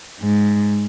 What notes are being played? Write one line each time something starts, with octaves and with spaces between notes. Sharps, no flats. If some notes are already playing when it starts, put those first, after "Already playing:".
G#2